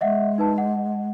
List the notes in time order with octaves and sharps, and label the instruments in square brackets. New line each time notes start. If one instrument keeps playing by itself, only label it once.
[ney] G#3 [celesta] D#5 E5 F#5
[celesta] D#4 B4 A5
F#5